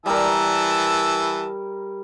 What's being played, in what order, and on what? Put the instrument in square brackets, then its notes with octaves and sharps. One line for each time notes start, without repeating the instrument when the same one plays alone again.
[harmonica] E3 A5 E6 [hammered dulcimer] G3 A#4